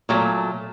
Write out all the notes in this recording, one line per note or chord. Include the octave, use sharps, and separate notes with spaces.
A#2 F#3 A3